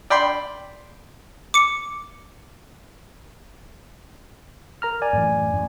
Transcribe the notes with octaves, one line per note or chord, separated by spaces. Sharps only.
D5 G5 B5 C6
D6 C#7
A#4 A#5 F6
D5 G#5
F#2 A2 E3
F#2 A2